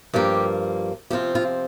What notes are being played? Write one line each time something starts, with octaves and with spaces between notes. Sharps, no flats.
G2 F3 A#3 G4
C3 F3 C4 F4 G4
F4